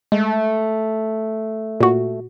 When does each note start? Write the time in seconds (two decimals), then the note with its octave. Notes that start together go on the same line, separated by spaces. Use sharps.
0.12 G#3 A3
1.81 A#2 F#4